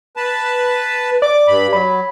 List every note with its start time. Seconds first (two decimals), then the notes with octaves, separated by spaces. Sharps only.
0.17 B4 A5
1.22 D5 D6
1.48 G2 B5
1.73 F#3 B5